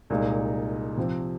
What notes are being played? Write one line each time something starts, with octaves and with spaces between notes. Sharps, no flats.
C2 A#2 G#3 D#4
C3 F3 C4